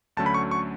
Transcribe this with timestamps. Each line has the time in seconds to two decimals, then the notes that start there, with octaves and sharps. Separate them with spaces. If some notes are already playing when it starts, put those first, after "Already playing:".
0.17 D2 D3 F#3 A3 C#4 A5
0.26 B5
0.34 C#6
0.51 C#6